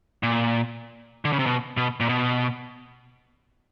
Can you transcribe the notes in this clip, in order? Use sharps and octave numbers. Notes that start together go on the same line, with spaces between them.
A#2
D3
C#3
C3
B2
B2
A#2
B2